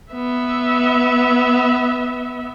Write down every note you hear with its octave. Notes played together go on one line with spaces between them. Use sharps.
B3 E5